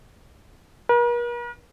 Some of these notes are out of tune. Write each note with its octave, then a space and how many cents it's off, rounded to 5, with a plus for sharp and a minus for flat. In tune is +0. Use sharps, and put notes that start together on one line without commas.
A#4 +45